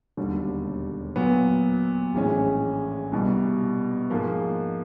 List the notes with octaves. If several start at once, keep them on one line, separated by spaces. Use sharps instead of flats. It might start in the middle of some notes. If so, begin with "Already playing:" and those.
E1 D#2 D3 G3
A#2 F#3 B3
A#1 A2 E3 G#3 C#4
C2 B2 G3
G#2 F3 A#3